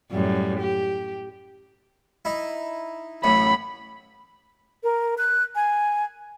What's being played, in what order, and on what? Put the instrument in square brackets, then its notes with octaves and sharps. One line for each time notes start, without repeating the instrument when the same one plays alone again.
[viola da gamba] F#2 A2 G3
G4
[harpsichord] D#4 E4
[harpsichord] A1 F#2 A2 [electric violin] B5
[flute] A#4
F#6
G#5